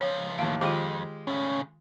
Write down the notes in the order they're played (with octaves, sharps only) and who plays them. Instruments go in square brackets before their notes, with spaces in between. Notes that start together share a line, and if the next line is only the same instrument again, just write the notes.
[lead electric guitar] C#2 F3 [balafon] C#5
[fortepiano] D#2 A2 [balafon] F5
[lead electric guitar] F2 [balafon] D#3 F4 [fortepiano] G#3 G4 F5
[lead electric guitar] A2 C#3 [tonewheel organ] C#4